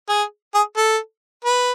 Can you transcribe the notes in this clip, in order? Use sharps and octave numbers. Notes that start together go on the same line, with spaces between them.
G#4
G#4
A4
B4